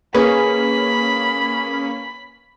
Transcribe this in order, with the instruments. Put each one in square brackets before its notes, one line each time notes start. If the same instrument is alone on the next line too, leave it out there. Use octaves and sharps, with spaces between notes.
[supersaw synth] A#3 C#4 [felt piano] G#4 [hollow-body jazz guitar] B4 [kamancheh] B5